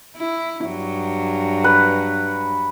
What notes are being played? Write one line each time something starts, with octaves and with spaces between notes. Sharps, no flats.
E4
G2 F#3
B4